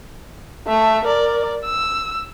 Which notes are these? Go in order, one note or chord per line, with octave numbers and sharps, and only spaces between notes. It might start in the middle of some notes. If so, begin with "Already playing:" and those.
A3 E5
A#4 D5
E6